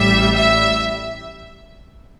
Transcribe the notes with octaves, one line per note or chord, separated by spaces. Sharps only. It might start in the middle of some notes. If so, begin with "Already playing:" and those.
Already playing: A1 A2 G3 E5
E5